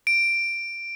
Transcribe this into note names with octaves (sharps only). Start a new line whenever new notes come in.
D7